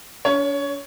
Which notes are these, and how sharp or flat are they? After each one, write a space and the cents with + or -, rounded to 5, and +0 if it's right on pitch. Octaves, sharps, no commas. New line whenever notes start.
D4 -45 C#5 +15